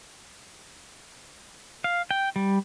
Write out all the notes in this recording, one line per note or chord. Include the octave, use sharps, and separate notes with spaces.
F5
G5
G3